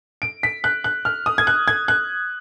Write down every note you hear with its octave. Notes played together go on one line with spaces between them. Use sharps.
D7
B6
F#6
F#6
F6
D#6
G#6
F#6
G#6
F#6